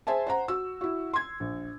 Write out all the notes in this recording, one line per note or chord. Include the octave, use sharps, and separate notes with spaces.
G#4 C5 E5 G#5 A5
C5 F#5 A#5
F#4 E6
E4 F#4
C6 G#6
A#1